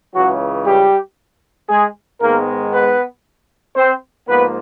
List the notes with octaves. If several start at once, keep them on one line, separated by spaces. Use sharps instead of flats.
C#2 C#3 E3 F#3 F#4
G3 G4
G#3 G#4
G#2 D#3 G#3 A#3 B3 A#4
B3 B4
C4 C5
G#2 F3 A#3 B3 B4